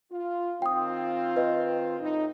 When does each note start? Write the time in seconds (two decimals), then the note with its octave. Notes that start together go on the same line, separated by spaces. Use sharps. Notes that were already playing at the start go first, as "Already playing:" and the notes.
0.11 F4
0.62 D#3 C4 F4 G5 D#6
1.36 B4 D#5
2.00 A2 D#4